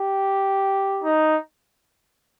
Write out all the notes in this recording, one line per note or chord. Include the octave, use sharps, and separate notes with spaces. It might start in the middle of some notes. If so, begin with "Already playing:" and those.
Already playing: G4
D#4